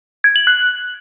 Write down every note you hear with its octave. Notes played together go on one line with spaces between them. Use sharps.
G#6
F#7
F#6